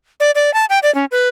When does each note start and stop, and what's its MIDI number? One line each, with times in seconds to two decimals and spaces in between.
0.20 0.31 74
0.35 0.53 74
0.54 0.65 81
0.70 0.79 79
0.83 0.93 74
0.95 1.05 61
1.11 1.28 71